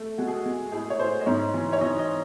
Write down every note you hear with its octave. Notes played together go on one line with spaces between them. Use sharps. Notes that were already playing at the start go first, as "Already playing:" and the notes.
Already playing: A3
G#3 F#4
G#4
F#4
G#3
A2 G#4
C#5
A2 C5
D#5
G#2 C#5
E3
C#5
E3 D#5
D#5